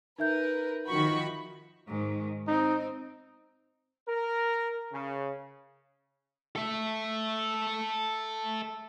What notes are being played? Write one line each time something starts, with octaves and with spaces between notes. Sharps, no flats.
D#4 A#4 B4 E5 G6
D#3 F3 F#4 B5 C#6
G#2 D#3
C4 D#4
A#4
C#3
A4 E5